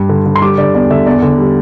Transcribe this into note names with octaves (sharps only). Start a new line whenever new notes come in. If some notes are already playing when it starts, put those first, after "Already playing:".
Already playing: G2 G3
D3
D3
C6
G3 D6
D3 D5
E2 D5
D3 E5
E2 D5
D3
G3